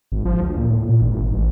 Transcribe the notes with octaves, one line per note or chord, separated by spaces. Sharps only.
G#1
F3
D2
A#2
A2
A#2
G#1
A1